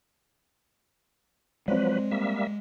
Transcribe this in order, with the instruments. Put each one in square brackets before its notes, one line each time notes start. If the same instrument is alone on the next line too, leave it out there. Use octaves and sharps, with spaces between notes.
[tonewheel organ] F3 F#3 B4 [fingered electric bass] G#3 [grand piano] C4 D5
[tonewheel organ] G3 A#3 E5